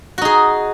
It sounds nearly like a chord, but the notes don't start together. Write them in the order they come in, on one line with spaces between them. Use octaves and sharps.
F#4 D#4 G#4